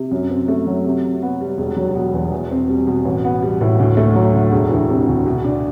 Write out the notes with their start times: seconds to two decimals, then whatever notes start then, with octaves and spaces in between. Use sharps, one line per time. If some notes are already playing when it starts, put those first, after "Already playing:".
Already playing: C3
0.11 F#2
0.31 C4
0.48 A3
0.67 F#3
0.85 C3
1.04 C3
1.22 B3
1.41 G3
1.58 E1
1.77 F#3
1.95 B2
2.13 E2
2.32 E2
2.51 C4
2.69 G3
2.87 B2
3.05 A1
3.24 B3
3.43 G3
3.61 A2
3.79 D2
3.97 A3
4.15 F#3
4.34 D3
4.52 E1
4.71 E3
4.90 C3
5.08 D2
5.26 B2
5.44 D4